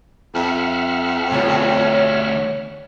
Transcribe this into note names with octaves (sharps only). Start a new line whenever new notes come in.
F2 E5 F#5 F6
D2 G3 C#5